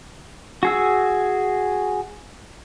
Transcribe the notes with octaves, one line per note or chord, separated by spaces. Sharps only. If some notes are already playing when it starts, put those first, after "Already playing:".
F#4 G#4 E6